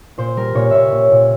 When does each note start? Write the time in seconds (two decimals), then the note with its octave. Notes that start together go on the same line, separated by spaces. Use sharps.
0.18 A#2 C5
0.37 G3 A#4
0.55 A#2 C#5
0.71 A#2 C#5 E5
0.92 A#2
1.12 A#2